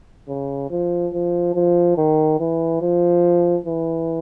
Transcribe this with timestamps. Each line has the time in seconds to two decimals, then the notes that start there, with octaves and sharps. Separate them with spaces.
0.28 C#3
0.70 F3
1.13 F3
1.55 F3
1.97 D#3
2.40 E3
2.82 F3
3.66 E3